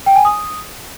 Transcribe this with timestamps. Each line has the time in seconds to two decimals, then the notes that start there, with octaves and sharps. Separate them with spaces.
0.06 G5
0.16 G#5
0.25 D#6